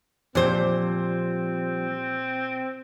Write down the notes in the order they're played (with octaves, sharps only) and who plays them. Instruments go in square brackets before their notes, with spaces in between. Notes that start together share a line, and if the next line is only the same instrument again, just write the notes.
[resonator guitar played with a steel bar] A#2 C5 [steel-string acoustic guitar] F3 G3 [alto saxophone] C4